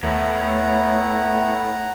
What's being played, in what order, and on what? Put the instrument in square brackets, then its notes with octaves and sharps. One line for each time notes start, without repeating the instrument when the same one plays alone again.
[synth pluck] D#2 [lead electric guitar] A2 [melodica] A3 B3 E4 [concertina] F#5 A#5